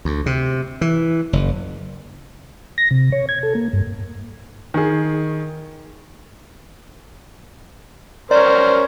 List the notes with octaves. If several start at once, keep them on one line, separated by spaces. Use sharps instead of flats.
D2
C3
E3
F#1
A#6
C3
C#5
G#6
A4
A#3
G2
D#3 G#4
C#4 A#4 C5 D5